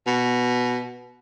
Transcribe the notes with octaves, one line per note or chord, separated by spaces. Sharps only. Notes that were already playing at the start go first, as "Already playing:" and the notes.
B2